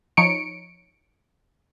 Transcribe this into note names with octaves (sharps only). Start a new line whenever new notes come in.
F3 D#4 C#5 C#7 D7